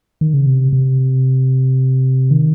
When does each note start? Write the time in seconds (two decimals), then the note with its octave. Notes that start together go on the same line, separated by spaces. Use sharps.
0.21 D#3
0.34 C#3
0.46 C3
0.73 C3
2.30 D#3